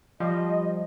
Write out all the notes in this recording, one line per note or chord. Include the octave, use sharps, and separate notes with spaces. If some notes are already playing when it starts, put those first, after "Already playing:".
F3 G3 D#5